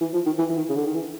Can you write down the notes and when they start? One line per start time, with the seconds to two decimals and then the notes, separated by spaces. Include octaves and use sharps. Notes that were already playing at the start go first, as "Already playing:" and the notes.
0.01 E3
0.13 F3
0.26 D#3
0.38 E3
0.50 E3
0.57 D#3
0.69 C#3
0.76 D3
0.86 D#3
0.94 E3